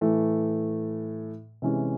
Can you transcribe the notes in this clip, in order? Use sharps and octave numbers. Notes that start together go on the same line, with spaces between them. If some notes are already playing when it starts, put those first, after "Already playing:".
A2 E3 A3
C3 E3 G#3 C#4